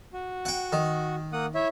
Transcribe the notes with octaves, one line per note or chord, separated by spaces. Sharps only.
F#4
F#5 G5
D#3
A#3 F#5 D#6
E4 C#5 E5